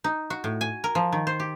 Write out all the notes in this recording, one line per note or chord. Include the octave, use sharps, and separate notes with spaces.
D#4
F#4
A2
G#5
A#4
F3
D#3
C5
G4